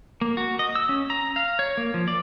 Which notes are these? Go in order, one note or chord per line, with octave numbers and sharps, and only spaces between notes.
A#3
F#4
D#5
E6
C#4
A#5
F5
C#5
A#3
F3
D5